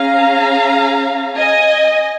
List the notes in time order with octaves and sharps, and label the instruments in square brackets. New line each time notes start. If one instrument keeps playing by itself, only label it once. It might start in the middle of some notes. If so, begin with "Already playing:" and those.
Already playing: [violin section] C#4 G#4 F5 A#5
D#5 G#5